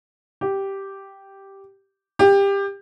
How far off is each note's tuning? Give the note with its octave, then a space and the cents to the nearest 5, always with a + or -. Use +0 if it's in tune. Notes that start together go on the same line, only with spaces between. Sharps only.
G4 -5
G4 +20